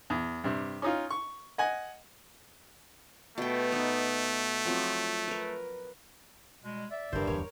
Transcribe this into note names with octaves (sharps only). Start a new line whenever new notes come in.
E2
G2 C3
C#4 D#4 F4
C#6
D#5 F#5 G#5
B2 A3 G5
B3 D#4
F3 F#3 C4
A#4 B4
B2 G3 G#3
D5 E5
F#1 G2 D3 D#3 A#4 C5
D1 E2 A#4 C#5